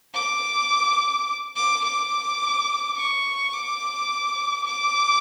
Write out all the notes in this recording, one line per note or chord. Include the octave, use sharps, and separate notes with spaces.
D6
D6
D6
C#6
D6
D6